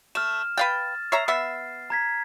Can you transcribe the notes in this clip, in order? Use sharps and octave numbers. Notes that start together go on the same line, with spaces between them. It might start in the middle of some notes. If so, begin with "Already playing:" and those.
A3 F6 E7
B4 F5 G5 A6
C#5 E5 A#5 C7
B3 E5
A#5 G#6 B6